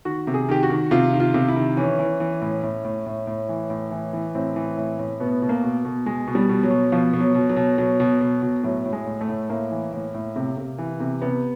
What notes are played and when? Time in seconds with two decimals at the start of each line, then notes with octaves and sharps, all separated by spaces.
0.05 D#3 F#4
0.27 C3
0.34 G#4
0.49 D#3 G4
0.63 F#4
0.70 D#3
0.91 C3 F4
1.13 D#3
1.20 F4
1.34 C3
1.48 E4
1.56 D#3
1.77 E3 C#4
1.99 E3
2.20 E3
2.42 A2
2.63 A2
2.85 A2
3.06 A2
3.27 A2
3.49 E3
3.70 A2
3.91 E3
4.13 E3
4.35 A2 C4
4.56 E3
4.77 A2
4.99 A2
5.20 B2 B3
5.42 B2
5.49 A#3
5.63 B2
5.85 B2
6.06 B2 G#3
6.27 B2
6.35 G3
6.49 B2
6.64 F#3
6.70 B2
6.92 B2 F3
7.13 B2
7.20 F#3
7.35 B2
7.49 F#3
7.56 B2
7.78 B2 F#3
8.00 B2
8.21 B2
8.42 B2
8.63 A2 F#3
8.85 A2
8.93 G#3
9.06 A2
9.21 A3
9.29 A2
9.50 A2 A#3
9.71 E3
9.93 A2
10.14 A2
10.36 C3
10.57 C3
10.78 E3
11.00 C3
11.21 C3 B3